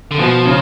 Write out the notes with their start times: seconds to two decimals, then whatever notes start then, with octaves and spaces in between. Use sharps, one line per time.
0.11 D3
0.19 B2 F3
0.45 C#3